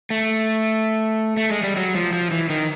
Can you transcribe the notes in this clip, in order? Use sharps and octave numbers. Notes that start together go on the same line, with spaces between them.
A3
A3
G#3
G3
F#3
F3
F3
E3
D#3